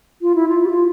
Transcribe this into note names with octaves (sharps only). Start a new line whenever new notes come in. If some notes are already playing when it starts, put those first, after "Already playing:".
F4
E4
F4
G4
F4